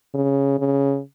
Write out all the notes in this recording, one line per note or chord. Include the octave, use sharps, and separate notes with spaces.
C#3
C#3